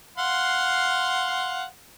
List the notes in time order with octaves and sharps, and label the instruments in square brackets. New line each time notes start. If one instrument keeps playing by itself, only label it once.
[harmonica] F5 F#5 C6